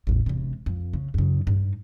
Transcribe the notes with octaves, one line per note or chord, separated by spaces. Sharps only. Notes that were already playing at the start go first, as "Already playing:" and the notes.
A1 E2
E1 C3
F2
C#3
F#2 C#3
G2 D#4